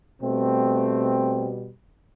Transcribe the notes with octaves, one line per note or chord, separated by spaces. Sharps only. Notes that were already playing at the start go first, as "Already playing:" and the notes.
B2 G3 A3 C4